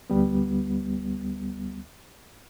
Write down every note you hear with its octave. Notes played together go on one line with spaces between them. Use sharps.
D2 G3 B3